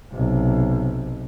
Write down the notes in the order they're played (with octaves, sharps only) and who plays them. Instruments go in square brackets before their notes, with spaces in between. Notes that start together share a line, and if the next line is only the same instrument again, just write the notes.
[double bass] B1 C3